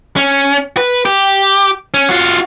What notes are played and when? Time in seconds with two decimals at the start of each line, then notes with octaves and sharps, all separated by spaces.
0.16 C#4
0.77 B4
1.05 G4
1.94 C#4
2.09 F4 F#4